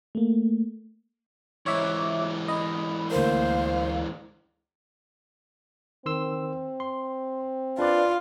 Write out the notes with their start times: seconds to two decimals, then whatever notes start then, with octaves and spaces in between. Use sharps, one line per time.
0.15 A3 A#3
1.66 G#2 E3 C#5 E5 D6
2.48 D#5 B5
3.11 D2 A#3 C5 F5
6.06 D#3 C4 C6 E6
6.80 C6
7.79 D4 F4 B4 D5